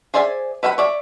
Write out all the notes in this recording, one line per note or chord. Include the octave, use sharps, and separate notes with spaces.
G#4 C5 D5 E5 G#5
B4 E5 F#5 G5 B5
C#5 D5 E5